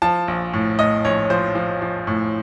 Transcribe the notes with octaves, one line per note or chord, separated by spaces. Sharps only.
F3 A5
A#1
A2
A2 D#5
A#1 C#5
F3 C5
F3
F3
A2